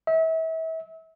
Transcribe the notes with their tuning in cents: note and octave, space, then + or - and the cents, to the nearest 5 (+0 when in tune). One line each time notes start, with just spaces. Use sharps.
E5 -35